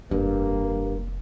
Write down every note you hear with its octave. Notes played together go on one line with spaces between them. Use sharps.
F1 G2 A#3